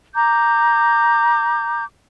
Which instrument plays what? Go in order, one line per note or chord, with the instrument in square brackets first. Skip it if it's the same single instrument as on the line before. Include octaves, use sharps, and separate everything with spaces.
[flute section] A#5 D6 G6